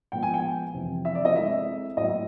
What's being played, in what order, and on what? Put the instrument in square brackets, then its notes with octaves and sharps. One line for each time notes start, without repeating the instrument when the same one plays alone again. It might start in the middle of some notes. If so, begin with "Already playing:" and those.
[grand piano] A#2 F3 G#3 B3 [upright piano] G5
[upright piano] G#5
G5
[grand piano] F2 C3 E3
[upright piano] E5
D5
D#5
[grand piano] G#3 C4 E4 A4 [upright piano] E5
[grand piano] A2 F#3 A#3 [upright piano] D#5